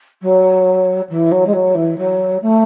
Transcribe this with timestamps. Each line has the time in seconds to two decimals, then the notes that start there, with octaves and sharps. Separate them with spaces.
0.21 F#3
1.09 E3
1.31 F#3
1.46 G#3
1.53 F#3
1.74 E3
1.97 F#3
2.41 A3